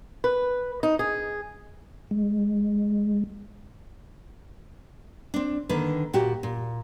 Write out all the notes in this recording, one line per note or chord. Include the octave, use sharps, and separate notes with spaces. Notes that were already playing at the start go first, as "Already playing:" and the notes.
B4
D#4
G#4
G#3
C4 D4
D3 D#3 A#3 B4
A#2 F#4 G4
A#2